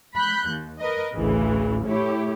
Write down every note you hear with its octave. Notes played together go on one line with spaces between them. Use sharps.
B5 F#6 G6
D#2
A#4 B4 D#5
A1 D2 C#3 E3
A3 E4 G4 C#5